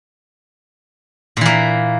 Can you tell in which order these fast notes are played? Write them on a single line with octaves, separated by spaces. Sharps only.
A#2 E3 A#3